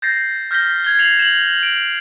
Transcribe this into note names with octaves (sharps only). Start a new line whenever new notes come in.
G6 A6 A#6 C7
F6 G6 A#6 B6 G7
G#6 G7
C7 F7 F#7
E7 F#7
D7